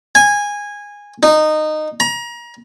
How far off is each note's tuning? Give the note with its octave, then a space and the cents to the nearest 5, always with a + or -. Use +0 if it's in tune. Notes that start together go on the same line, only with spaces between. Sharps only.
G#5 -15
D#4 -15
A#5 +30